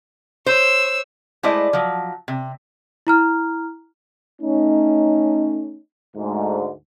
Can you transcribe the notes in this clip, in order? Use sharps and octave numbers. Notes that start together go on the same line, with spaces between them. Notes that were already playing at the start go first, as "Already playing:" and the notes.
C5 C#5 E6
G#3 A3 E4 C5 D5 D#5
F3 F#3
C3
E4 A#5 F6
A3 C#4 D#4
D2 G#2